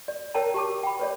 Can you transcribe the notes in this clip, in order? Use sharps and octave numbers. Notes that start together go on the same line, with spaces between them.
D5
A#4 C#5 G5 A5 A#5
G4 A5 D6
G5 B5
B4 C#5 D5